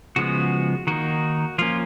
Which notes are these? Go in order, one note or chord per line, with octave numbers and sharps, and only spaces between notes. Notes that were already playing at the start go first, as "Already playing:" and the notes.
C#3 F3 G#3 B3 F#4
D#3 A#3 D#4 F#4
F3 A#3 C#4 F4